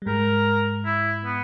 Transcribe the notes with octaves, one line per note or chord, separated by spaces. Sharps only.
G3
G#2 G#3 A#4
E4
B3